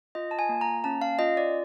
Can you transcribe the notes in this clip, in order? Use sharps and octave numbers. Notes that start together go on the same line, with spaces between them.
F4 D#5
A5
G#5
A#3
A#5
C#4 A5
F5
F4 D#5
D5